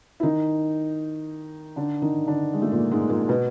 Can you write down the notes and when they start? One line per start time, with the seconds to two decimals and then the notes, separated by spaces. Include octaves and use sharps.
0.20 E4
0.23 D#3 D#4
1.76 D3 D4
2.02 D#3 D#4
2.27 D3 D4
2.53 G#3
2.62 A3
2.72 A#2 A#3
2.91 G#2 G#3
3.09 A#2 A#3
3.29 B2 B3